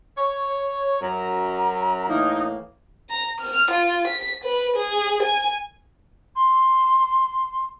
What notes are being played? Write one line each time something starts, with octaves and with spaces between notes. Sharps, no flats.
C#5
F#2 A#5
A2 E3 A#3 D#4
A#5
F6
F4
B6
B4
G#4
G#5
C6